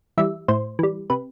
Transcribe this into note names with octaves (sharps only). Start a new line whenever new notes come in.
E3 G3 E5
A2 C5
E3 G3
C3 B4